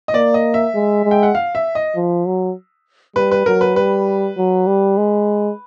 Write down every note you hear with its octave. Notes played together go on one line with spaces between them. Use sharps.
D#5
A#3 D5
D#5
E5
G#3
G#3
G5
F#5
F5
E5
D#5
F3
F#3
G3 B4
B4
F#3 A#4
B4
G3 B4
F#3
G3
G#3